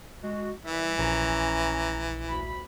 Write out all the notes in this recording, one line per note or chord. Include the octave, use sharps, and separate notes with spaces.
G#3 F#4
C2 E3 E5
A#1 C#4 G#5 A#5
D2 B5